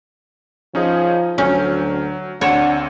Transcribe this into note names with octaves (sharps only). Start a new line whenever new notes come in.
F3 C#4 D#4 G#4
D2 F#3 C#4 F6 G6
D2 C4 D4 C#5 F#5 E7